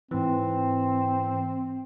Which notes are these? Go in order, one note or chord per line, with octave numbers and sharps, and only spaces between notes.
G#2 E3 C4